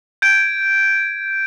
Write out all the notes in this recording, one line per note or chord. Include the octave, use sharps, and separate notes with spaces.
G6 G#6 D7